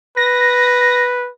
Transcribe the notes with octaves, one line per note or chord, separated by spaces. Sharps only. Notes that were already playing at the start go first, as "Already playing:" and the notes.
B4 A#6